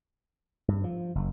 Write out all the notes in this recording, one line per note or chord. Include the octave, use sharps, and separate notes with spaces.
G2
F3
F#1